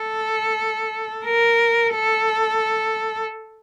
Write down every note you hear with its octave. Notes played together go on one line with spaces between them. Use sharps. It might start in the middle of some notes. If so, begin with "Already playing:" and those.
Already playing: A4
A#4
A4